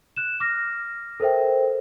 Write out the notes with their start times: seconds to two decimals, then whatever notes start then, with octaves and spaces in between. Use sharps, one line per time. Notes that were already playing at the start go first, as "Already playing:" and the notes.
0.16 F#6 E7
0.40 D6 F6 A#6
1.20 A4 A#4 C5 E5 G5